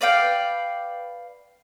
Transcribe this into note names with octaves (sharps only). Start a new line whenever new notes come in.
B4 D5 F5 G5